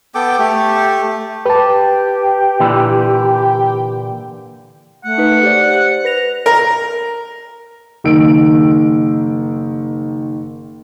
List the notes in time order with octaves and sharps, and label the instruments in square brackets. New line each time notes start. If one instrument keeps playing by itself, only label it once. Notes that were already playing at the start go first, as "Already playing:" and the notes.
[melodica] B3 A4 G5 D6
A3 G4
[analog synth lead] G4 [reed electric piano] B4 A5
[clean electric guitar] A#2 D3 E3
[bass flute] A3 [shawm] F#5
[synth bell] D#4 B4
[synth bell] G4 D5 [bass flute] C5
[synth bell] B4 A#6 F7
[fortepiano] A#4
[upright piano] F#1 D#3 E6 D7